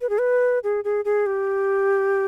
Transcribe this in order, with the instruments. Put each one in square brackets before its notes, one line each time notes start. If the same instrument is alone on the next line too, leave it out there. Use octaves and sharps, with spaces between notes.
[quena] B4
G#4
B4
G#4
G#4
G#4
G4